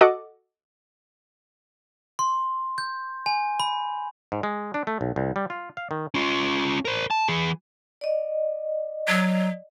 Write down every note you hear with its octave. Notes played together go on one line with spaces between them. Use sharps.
F#4 A4 D#5 F#5 D6
C6
G6
G#5
B5
G#2
G#3
D4
A3
B1
C2
G3
F4
F5
D#3
C#4 F4
A#4 C5
A5
E3 G#4
D5 D#5
F#3